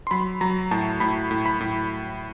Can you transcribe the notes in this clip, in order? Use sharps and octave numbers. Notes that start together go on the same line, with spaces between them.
C6
F#3 B5
F#3 A#5
A2 A5
A2 B5
A2
B5
A2